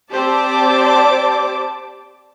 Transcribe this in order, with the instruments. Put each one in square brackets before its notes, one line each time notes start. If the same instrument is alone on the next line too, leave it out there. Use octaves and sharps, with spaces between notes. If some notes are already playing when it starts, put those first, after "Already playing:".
[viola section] C4 G4 C5 [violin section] D5 A5 D6